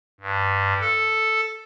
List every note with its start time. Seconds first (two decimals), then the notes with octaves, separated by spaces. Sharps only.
0.21 G2
0.80 A4